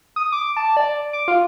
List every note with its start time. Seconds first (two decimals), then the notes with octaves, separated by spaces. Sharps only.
0.16 D#6
0.32 D6
0.57 A5
0.77 D5
1.13 D6
1.28 F4